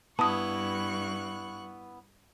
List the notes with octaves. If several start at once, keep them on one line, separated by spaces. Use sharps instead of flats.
G2 B3 E4 A5 C#6 D#6 F#6